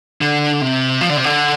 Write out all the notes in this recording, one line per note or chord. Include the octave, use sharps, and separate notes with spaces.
D3
C3
F3
D3
C3
D3